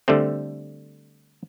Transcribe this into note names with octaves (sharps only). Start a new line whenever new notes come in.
D3 G3 A3 C4